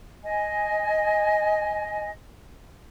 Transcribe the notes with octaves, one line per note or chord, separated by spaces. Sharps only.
D#5 G#5